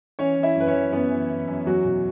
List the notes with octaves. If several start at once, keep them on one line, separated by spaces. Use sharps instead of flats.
E3 C#4 C#5
E3
E4 E5
F#2 B4
C#4 C#5
E3
F#2 B3 B4
E3
E3
F#2
E2 F#3 F#4
B2